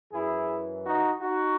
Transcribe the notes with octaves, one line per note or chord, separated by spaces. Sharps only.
F#2 E3 E4 G#4
D#4 F#4
D#4 F#4